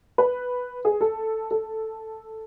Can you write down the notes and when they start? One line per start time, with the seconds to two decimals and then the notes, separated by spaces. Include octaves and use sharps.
0.18 B4
0.85 G#4
1.01 A4
1.51 A4